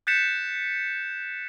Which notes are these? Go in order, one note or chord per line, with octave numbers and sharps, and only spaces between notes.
F#6 G6 A6 B6 C#7 E7